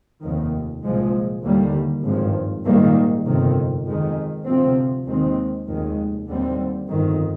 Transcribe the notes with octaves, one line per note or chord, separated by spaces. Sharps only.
F1 D#2 D#3
C2 A#2 F3 G#3
D#2 D3 G3 A#3
G#1 G2 F3
A#1 G#2 D#3 G3 A#3
G1 F2 C3 D#3
F2 D#3 G#3
D2 C3 F3 C4
D#2 D#3 G#3 C4
F1 D#2 D#3 G#3
D#2 D3 G3 C4
G1 F2 D#3